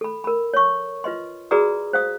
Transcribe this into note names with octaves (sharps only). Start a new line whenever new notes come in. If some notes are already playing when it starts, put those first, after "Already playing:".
A4 B5
A#4 B5
C#5 C#6
F4 B4 D#5 C6
F#4 G#4 B4 D5 A#5 D#6
C5 F5 D#6